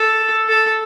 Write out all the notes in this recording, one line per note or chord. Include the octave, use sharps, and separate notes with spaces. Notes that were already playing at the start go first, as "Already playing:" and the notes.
Already playing: A4
A4